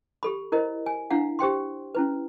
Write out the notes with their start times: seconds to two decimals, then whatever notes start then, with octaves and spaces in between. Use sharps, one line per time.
0.23 G4 A4 B5
0.52 E4 A#4 C5 D#5
0.86 G#5
1.10 D4 E4 F5 F#5
1.39 G4 C5 G5 C6
1.95 C#4 E4 B4